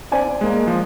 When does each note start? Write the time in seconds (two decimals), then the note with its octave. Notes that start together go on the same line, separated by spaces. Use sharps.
0.12 C5 D5 G#5
0.41 G#3 A#3
0.67 F3